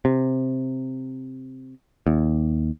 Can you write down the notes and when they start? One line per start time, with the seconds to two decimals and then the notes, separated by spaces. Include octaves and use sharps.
0.05 C3
2.07 D#2